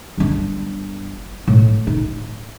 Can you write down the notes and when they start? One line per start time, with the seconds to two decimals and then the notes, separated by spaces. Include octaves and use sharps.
0.18 G1 D4
1.48 A2
1.87 D#4